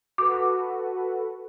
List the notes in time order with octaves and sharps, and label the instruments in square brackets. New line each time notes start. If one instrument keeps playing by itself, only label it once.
[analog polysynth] F#4 A4 B4 [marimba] D6